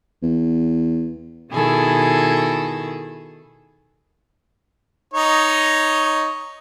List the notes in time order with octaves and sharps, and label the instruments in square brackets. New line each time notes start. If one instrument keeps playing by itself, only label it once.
[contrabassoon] E2
[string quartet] B2 D#3 E4 G#4 A4
[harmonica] D#4 C#5 D#5